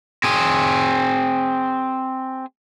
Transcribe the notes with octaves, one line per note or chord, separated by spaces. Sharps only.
C4 G#4